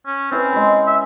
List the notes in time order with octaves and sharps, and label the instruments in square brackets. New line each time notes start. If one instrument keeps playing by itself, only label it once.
[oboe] C#4
[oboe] C4 [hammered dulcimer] C#4 E4 B4
[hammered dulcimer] G#3 B5
[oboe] E5